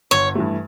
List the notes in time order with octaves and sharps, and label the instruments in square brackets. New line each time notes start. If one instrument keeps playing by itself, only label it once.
[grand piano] G1 [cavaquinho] C#5
[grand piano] G2 E3 A3